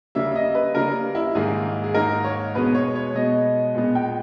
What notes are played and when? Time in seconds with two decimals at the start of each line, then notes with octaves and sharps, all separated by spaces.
0.15 C#3 G3 A#3 E5
0.31 E5
0.35 D#5
0.55 B4
0.75 C#3 G3 A#3 A#4
1.15 E4
1.35 G#2 D#3 A#3 G#4
1.84 G#4
1.94 G#2 D#3 A#3 A#4
2.24 C#5
2.55 B2 G#3 B3 B4
2.75 C#5
2.95 C#5
3.14 B2 G#3 B3 D#5
3.75 A#2 G#3 B3
3.95 G5